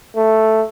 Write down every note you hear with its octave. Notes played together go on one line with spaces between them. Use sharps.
A3